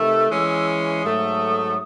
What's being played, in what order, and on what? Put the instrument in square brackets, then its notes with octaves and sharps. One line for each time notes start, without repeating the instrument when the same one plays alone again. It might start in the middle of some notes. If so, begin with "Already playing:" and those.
Already playing: [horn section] C3 D#3 A3 [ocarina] E6
[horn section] E3 G#3 C#4
[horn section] G#2 F#3 A3 [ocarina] D#6